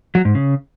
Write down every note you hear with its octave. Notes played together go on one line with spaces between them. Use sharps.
F#3
G#2
C#3